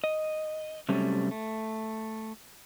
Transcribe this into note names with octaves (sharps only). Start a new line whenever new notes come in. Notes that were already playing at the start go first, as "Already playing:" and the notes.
D#5
C3 F#3 G3 A3 C4 C#4
A3